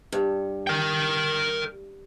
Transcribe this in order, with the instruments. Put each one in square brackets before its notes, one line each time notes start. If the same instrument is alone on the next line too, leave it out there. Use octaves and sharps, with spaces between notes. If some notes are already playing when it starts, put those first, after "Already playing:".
[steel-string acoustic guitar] G2
[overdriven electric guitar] A#4 G5